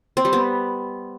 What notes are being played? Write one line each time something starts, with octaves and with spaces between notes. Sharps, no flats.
C4
G3
B3